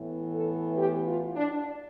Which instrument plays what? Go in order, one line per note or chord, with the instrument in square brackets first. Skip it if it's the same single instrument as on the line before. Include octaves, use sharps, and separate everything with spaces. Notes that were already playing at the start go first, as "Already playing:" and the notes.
Already playing: [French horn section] A2 E3 B3
A4
G4
F4
D4